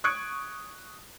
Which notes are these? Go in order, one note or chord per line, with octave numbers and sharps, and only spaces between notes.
C#6 D#6 F#6 G#6 C#7 D7